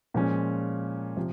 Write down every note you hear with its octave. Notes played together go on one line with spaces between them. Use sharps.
A#2 F3 G#3 C#4
C3 F3